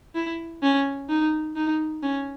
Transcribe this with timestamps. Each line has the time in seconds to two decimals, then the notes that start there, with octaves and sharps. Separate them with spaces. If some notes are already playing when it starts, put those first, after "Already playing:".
0.15 E4
0.63 C#4
1.10 D#4
1.56 D#4
2.03 C#4